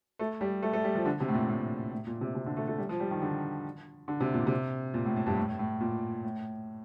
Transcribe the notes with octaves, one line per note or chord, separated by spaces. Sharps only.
A3
G3
A3
A3
G3
F3
D3
C3
A2
A#2
A2
A2
A#2
C3
C3
D3
A3
A3
G3
F3
G3
D#3
D3
D3
C3
A#2
C3
A#2
A2
A2
G2
A2
A2
A2
A#2
A2